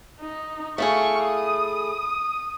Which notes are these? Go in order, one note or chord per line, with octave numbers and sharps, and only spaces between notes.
D#4
A3 E4 G#4 F5 C#6
D#6